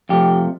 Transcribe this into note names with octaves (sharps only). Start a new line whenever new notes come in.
F2 C3 F3 A3 G4